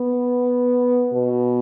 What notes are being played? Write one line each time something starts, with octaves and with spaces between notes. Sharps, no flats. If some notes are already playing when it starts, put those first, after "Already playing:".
Already playing: B3
B2